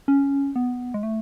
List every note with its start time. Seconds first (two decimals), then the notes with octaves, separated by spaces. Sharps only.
0.08 C#4
0.56 B3
0.94 G#3
1.03 A3